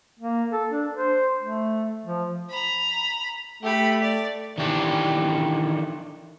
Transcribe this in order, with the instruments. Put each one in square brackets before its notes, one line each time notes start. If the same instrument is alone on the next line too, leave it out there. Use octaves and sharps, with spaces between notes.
[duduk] A#3
A4
D4
C5
A3
F3
[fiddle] A#5 B5
[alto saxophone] A3 [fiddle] G4 B5
[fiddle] D5
[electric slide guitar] D#3 E3 D4 G4 A4